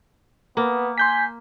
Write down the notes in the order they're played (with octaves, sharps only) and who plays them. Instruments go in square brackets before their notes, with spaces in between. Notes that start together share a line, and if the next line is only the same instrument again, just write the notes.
[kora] A#3 [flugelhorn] B3
[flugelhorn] G#5 [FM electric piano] C6 G6 B6